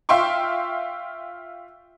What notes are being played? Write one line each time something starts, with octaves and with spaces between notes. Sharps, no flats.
F4 E5 F5 G5 C6 C#6